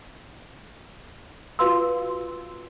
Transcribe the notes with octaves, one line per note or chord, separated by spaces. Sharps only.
F4 F#4 B4 F5 C6 E6